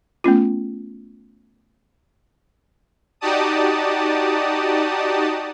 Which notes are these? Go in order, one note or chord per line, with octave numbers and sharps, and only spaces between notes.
A3 B3 C#4 F4
D#4 F#4 G4 D5 A5 D#6